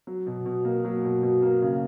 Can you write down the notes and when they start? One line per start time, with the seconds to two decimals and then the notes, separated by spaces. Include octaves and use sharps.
0.07 F#3
0.26 B2
0.46 B2
0.65 A#3
0.85 F#3
1.04 B2
1.23 B2
1.42 A#3
1.62 C#3